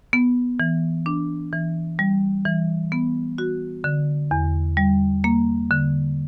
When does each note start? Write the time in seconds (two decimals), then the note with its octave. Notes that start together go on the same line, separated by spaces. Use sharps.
0.13 B3
0.60 E3
1.06 D4
1.53 E3
1.99 G3
2.45 E3
2.92 B3
3.38 F#4
3.84 D3
4.31 E2
4.77 G3
5.24 A#3
5.71 D3